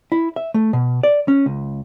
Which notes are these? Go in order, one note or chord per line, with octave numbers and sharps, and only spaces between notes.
E4
E5
A3
B2
D5
C#4
C#2